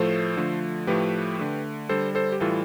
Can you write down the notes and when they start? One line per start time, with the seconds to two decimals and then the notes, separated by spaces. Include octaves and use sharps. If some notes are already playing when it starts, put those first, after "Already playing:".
Already playing: A2 F3 A3 A4 C5
0.37 D3 F3 A3
0.87 A2 F3 A3 G4 B4
1.39 D3 A3
1.89 D3 G3 A4 C5
2.15 A4 C5
2.32 G4
2.40 A2 E3 G3 F4 A4